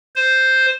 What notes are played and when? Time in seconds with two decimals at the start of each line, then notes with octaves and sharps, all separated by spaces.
0.16 C5